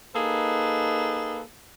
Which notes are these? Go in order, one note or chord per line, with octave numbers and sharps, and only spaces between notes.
A#3 D#4 G#4 A4 B4